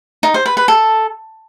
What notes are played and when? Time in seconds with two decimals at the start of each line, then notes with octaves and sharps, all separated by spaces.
0.23 D#4
0.34 C5
0.46 B4
0.57 B4
0.68 A4